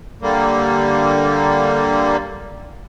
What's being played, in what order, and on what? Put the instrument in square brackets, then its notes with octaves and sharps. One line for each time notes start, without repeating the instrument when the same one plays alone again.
[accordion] D3 G3 A#3